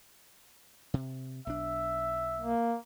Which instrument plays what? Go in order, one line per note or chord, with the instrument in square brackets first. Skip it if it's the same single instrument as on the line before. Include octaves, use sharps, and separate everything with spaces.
[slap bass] C3
[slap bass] B1 D4 [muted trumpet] E5
[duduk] A#3